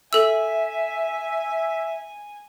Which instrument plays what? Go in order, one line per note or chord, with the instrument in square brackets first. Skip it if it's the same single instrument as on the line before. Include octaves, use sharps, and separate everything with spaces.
[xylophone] A4 E6 [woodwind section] E5 [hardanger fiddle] G#5